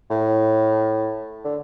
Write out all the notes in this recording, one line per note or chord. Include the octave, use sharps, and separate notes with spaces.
A2
D3